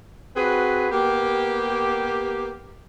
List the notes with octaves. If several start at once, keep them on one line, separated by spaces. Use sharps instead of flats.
C4 F#4 G#4 B4
A#3 B3 G4